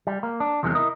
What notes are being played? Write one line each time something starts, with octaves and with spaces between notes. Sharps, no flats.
G3
A#3
D4
E2 C3 D#3 F#3 G#3
E4 A#4 D#5